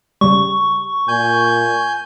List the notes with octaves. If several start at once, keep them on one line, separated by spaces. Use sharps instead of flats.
C#3 G3 C#6
A#2 G#5 G6